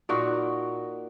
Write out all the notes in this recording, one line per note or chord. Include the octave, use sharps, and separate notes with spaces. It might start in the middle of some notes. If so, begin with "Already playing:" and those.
A#2 A#3 D#4 F#4